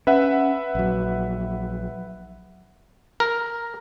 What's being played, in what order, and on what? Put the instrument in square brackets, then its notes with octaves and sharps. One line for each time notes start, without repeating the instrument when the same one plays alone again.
[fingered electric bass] C#4 [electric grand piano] B4 E5 F#5
[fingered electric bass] A#1 F#3
[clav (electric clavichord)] A#4